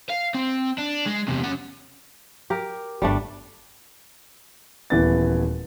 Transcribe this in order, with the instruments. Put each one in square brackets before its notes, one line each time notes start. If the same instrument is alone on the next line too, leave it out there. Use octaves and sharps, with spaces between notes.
[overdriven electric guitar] F5
C4
D4
G#3
E2 C3
C#4 F#5
[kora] G4 A#4
[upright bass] G1 [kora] G3 A3 D4
[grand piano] D#1 E3 B3 A6